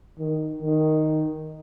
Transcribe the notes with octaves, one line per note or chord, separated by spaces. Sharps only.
D#3
D#3